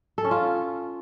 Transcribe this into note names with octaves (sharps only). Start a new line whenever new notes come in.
A4
C#4
F4